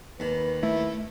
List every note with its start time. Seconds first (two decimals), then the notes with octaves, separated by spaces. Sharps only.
0.20 D#2 D#3 B4
0.63 A3 E4